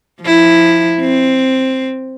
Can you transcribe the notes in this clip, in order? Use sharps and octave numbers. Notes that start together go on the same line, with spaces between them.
F3 E4
C4